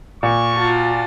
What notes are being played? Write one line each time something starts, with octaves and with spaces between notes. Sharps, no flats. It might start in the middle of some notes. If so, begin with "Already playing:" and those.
A#2 C#6
F4 F#4 A5